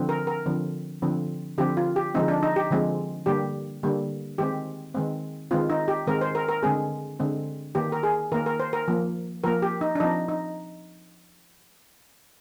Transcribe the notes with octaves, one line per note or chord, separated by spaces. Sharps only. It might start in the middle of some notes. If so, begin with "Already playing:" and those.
Already playing: D3 F3 C4
A#4
A#4
D3 F3 C4
D3 F3 C4
D3 F3 C4 G4
F4
G4
D3 F3 G#3 C4 D#4
D4
D#4
G4
D3 F3 G#3 C4
D3 G3 A#3 G4
D3 G3 A#3
D#3 G#3 C4 G4
D#3 G#3 C4
D#3 G#3 C4 F4
D#4
G4
D#3 G#3 C4 A#4
C5
A#4
A#4
D3 G#3 C4 G#4
D3 G#3 C4
D#3 A#3 G4
A#4
G#4
D#3 A#3 A#4
A#4
C5
A#4
F3 A#3
F3 A#3 A#4
G4
D#4
D4
F3 C4 D#4
D#4